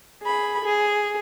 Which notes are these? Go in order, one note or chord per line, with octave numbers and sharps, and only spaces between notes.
G#4 B5
G#4